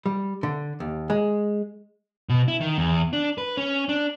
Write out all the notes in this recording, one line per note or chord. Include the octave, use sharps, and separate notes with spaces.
G3
D3
D#2
G#3
B2
E4
D#3
E2
D4
B4
C#4
D4